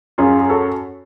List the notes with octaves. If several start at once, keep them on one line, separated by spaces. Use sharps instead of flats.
F#2 F4 G#4
G#4
F#4 A4